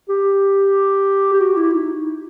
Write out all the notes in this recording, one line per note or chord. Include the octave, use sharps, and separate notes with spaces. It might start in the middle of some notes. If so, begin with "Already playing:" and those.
G4
G4
F#4
E4
D#4